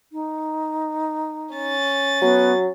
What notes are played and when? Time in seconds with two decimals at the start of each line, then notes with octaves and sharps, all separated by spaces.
0.13 D#4
1.54 C#4 A6
2.22 F#3 B3